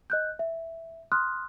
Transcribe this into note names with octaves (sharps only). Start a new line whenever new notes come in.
D#5 F#6 G6
E5
C6 D#6 F6 F#6